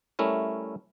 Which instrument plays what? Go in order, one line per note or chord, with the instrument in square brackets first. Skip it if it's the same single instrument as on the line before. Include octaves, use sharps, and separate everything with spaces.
[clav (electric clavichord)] G3 A3 C#4 E4 A#4